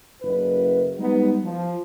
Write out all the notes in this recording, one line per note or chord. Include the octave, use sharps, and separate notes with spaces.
F#1 B4
G3 G#3 B3 D#4
F3